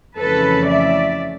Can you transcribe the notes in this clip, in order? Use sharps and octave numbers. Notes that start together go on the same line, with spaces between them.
F2 C#3 E3 A3 C#4 A4 B4
D5 E5